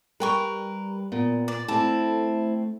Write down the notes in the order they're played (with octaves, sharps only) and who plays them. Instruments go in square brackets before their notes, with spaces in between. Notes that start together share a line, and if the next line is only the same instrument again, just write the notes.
[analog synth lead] G3 [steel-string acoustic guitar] A#4 [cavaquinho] B4 G5 C#6
[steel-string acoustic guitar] A#2 [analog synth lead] B3
[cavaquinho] D5 [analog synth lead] D6
[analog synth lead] A3 [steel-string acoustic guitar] C4 E4 [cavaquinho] A5